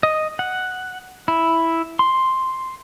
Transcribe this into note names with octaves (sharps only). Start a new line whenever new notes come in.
D#5
F#5
E4
C6